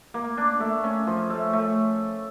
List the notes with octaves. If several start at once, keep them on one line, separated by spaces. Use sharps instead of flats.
A#3
D4
A3
C#4
F3
A3
A3